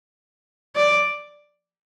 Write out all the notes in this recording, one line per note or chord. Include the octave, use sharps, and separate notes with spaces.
D5